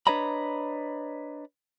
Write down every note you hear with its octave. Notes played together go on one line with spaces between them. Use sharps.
D4 B4 C#5 D#5 A#5 B5